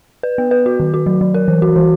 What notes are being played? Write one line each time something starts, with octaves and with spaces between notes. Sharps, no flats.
B4
B3
B4
F#4
D#3
F#4
F#3
F#3
A#4
E3
F#4
E3